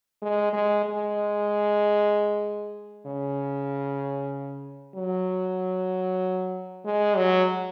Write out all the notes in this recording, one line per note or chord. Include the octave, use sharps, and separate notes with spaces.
G#3
G#3
G#3
C#3
F#3
G#3
F#3